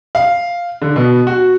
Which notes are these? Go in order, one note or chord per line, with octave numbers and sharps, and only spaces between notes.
F5
D3
B2
F#4